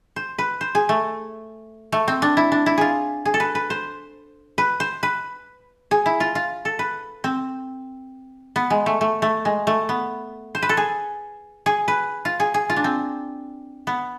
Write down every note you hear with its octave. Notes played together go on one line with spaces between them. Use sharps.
C5
B4
C5
G#4
A3
A3
C4
D4
E4
D4
E4
F4 G#4
G#4
A4
B4
B4
C5
B4
C5
B4
G#4
E4
F4
F4
A4
B4
C4
B3
G#3
A3
A3
A3
G#3
A3
B3
C5
B4
A4
G#4
G#4
B4
F4
G#4
G#4
F4
D4
C4
B3